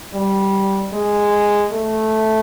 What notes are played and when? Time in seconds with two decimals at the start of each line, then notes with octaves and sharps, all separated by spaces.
0.13 G3
0.93 G#3
1.71 A3